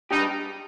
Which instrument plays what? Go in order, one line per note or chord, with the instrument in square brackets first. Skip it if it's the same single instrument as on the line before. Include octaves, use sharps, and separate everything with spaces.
[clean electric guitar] G#2 G3 D4 G4 [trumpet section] D#4